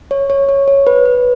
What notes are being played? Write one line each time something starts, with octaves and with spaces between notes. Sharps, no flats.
C#5
C#5
C#5
C#5
B4
B4